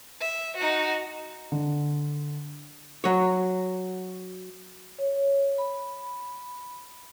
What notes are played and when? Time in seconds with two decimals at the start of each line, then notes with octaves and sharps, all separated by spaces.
0.21 E5
0.57 D#4 F#4
1.52 D3
3.04 F#3 C#5
4.99 C#5
5.58 B5